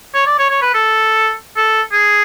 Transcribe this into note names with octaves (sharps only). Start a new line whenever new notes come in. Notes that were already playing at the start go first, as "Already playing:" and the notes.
C#5
D5
C#5
C#5
B4
A4
A4
G#4